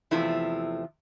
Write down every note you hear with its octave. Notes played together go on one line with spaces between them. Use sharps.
E2 C3 F3 A3 E4